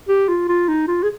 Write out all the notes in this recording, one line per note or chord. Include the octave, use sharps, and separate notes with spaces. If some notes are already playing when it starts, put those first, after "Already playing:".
G4
F4
F4
D#4
F4
G#4